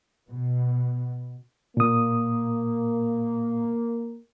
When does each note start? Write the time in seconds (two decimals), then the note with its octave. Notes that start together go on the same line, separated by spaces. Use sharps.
0.28 B2
1.77 A#2 A#3 D#6